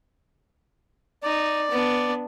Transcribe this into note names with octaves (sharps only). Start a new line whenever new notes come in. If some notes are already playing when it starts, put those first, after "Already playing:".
D#4 D5
B3 D4